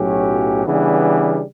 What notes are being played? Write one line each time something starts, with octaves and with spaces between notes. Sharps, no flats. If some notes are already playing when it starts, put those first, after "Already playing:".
Already playing: B1 A2 F#3 C#4 G4
C#3 E3 G3 B3 D4